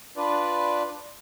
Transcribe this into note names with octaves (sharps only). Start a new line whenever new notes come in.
D4 F4 B4 D5